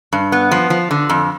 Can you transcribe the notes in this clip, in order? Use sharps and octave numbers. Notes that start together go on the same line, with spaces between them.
G2
B3
F3
F3
D3
F2